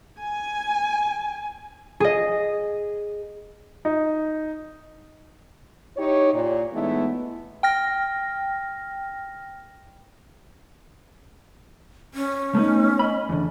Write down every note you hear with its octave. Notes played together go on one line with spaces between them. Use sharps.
G#5
G#4 D#5
D#4
D#4 E4 G4 C#5
A#2
E3 G#3 A3 B3 D#4 E4
G5 F6 A#6
C#4
A3 B3 D#4
D#5 B5
E2 D3